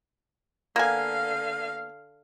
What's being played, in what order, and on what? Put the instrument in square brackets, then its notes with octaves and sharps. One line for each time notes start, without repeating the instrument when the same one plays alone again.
[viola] D3 F5 [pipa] A#3 B3 G#5